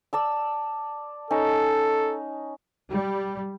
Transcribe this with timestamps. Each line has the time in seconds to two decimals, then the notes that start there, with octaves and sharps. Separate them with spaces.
0.13 D5 A5 E6
1.30 C#4 D#4 A4
2.90 G3